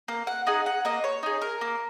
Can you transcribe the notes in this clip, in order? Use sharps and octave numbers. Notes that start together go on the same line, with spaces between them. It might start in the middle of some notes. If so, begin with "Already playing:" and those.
A#3
F#5
D#4 G#4 F#5
F#5
A#3 D#5
C#5
D#4 G#4
A#4
A#3